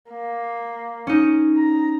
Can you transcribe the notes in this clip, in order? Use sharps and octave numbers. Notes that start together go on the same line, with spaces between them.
A#3
C#4 D#4
A#5